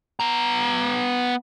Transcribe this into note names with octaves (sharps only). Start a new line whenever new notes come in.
B3 A#5